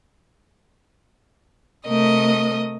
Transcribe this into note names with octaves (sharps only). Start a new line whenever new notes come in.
C3 A3 A#4 D#5 D#6